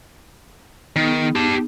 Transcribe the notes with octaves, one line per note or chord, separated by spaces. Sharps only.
D#3 B3 D#4 G#4
G4 A5